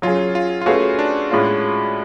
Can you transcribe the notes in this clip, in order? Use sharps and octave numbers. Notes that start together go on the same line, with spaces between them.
F#3 C#4 F4 G#4
F4
F4
A3 C#4 F#4 G#4 B4 F5
D4
A2 G#3 C#4 F4